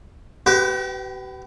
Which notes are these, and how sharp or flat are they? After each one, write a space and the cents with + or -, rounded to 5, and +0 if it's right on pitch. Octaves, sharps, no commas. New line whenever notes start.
G4 -45 B4 +15 G5 -5